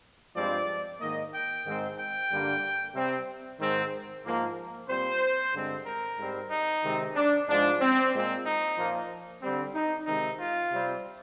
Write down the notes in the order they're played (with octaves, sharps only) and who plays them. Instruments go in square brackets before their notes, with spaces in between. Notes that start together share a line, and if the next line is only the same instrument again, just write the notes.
[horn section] G2 F3 G#3 C4 D5
G#2 D#3 A#3 D#5
G5
G#2 D#3 G#3 C4
G5
G2 D3 G3 A#3
C3 G3 C4
G#2 D#3 G#3 C4
G#2 F3 A#3
A#2 G3 C4 C5
G2 D3 G#3 C4
A#4
G#2 G3 C4
D#4
C3 D#3 G#3 C4
D4
G#2 F3 G#3 D4
C4
A#2 G#3 C4
D#4
A#2 F3 A#3
D3 G3 C4
D#4
C3 D#3 G#3 C4 D#4
F4
C3 G3 C4